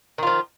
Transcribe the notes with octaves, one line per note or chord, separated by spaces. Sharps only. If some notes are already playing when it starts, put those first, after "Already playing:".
D#3 F3 F4